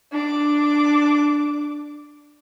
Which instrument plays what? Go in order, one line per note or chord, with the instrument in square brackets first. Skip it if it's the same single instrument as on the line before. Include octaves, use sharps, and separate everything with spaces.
[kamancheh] D4 D6